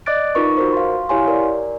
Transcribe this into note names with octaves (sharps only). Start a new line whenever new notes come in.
D5 D#5 D6 F#6 A6 D7
D#4 F4 A#4 B4 C#6
F#4 A#4 C5
F5 C6
E4 G4 C#5 F5 G#5 C6
A#4 D5